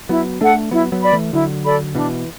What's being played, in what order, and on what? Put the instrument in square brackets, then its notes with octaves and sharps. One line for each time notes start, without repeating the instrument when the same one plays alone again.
[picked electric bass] F#3 B3 [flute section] E4
[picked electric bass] A3 D4 [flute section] A4 F#5
[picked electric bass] F#3 B3 [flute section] E4
[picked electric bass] F#3 B3
[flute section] D5 B5
[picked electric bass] E3 A3
[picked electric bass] D3 F#3 [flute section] E4
[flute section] A4 D5 B5
[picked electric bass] B2 E3 [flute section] D4